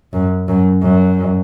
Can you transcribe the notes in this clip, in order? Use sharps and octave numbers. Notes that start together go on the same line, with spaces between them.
F#2
F#2
F#2